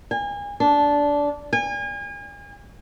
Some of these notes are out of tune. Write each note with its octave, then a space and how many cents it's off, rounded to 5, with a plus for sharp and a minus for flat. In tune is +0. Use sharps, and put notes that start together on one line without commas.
G#5 -35
D4 -15
G#5 -35